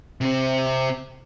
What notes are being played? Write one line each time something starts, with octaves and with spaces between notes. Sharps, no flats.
C3 C4